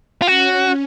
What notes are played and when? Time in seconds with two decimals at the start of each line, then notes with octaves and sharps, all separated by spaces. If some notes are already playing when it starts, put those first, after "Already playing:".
0.22 F4
0.27 C#4 F#4